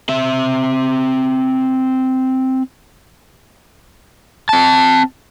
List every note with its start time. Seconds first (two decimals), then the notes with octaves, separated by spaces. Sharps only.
0.09 C4 E5
4.49 C4 A5